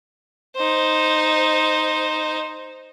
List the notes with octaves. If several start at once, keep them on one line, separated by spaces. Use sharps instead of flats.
D#4 C5